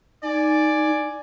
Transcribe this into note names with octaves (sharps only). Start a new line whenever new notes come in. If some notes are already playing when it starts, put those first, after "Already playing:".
D#4 D5 G#5